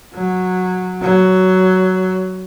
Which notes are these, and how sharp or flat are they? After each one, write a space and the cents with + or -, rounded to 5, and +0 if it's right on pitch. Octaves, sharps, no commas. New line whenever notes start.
F#3 -10
F#3 +10